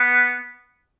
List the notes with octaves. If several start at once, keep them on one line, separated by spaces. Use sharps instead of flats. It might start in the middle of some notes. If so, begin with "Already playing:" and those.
Already playing: B3